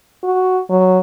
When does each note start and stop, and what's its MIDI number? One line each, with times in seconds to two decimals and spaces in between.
0.24 0.61 66
0.70 1.00 54